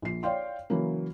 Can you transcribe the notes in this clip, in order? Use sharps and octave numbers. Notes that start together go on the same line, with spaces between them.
A#1 C7
C#5 D5 F5 G5 C6
C#3 E3 F#3 A#3